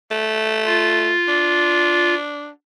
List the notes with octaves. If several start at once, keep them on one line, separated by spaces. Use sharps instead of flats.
A3
F4
D4